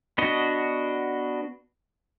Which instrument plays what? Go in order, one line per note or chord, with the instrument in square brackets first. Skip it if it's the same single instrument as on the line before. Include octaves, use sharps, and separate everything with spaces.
[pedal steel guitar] B3 D4 F#4 D#5